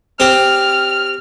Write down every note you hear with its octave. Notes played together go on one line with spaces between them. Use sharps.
C4 G4 F6